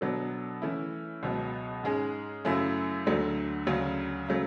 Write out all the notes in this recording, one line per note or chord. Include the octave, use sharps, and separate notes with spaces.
B2 F#3 B3 D4 A4
E3 A3 C#4 E4
C#2 B2 F#3 B3
G#2 G#3 C#4 G#4
F#2 C#3 F#3 A3 E4
D2 D3 F#3 A3
D2 C#3 F#3 C#4
C#3 F#3 A3